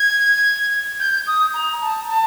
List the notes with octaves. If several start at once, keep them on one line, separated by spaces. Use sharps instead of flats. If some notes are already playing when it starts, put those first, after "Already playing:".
Already playing: G#6
G6
D#6
A#5
A5
A5